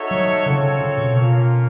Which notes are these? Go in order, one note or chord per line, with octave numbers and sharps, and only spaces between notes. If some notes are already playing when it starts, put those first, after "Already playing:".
Already playing: D#4 F#4 A4 C#5 E5
F#3
C#3 C4 F4 A4 C#5
C#3
B2
A#3 C#4 F4